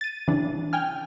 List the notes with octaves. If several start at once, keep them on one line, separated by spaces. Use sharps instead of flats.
A6 D#7
C#3 E3 G3 D4
G5 G#5 F6